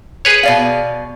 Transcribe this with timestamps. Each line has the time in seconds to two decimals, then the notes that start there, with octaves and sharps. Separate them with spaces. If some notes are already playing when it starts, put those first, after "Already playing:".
0.25 G#4 B4 C#5
0.43 B2 D5 F5